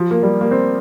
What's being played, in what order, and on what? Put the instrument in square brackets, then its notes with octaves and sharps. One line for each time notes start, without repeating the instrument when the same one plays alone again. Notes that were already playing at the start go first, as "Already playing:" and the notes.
Already playing: [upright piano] F3
A#3
G3
A#3
C4